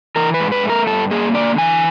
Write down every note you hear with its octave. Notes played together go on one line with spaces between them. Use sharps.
E3 A#4
B4
G#2
B4
A3
A#4
G2 A4
A#3 G#4
D3 D5
E3 G#5